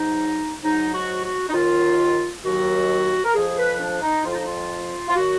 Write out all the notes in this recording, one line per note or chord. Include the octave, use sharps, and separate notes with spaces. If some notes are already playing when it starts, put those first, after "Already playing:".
Already playing: G#2 F#3 D#4
G#2 F#3 D#4
F#4
F#4
D#4
D#2 D#3 F#3 F4
D#2 D#3 F#3 F#4
A#4
F2 F3 G#4
B4
D4
D#4
F2 F3 F4
D#4
F4
F4
D#3 F#3 F#4